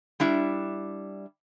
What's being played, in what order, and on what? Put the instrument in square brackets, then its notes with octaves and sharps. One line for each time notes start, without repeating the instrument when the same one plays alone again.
[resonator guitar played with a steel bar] G3 D4 E4